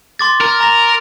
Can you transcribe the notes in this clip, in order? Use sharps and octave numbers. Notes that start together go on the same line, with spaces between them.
C6 D6 A6
A#4
A#5 A#6